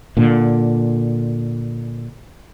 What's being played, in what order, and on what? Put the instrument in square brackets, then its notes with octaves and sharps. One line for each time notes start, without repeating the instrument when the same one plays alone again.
[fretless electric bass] A#2 D3